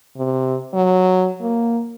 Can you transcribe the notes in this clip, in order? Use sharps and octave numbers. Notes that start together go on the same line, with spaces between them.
C3
F#3
A#3